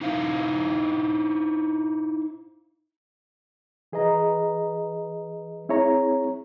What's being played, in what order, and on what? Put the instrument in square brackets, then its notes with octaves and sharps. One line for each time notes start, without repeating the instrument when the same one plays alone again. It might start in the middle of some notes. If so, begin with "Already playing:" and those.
[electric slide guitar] D#4 E4 C5 E5 F5
[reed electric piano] E3 G#4 B4 D#5 A#5
C4 E4 G#4 C#5 A#5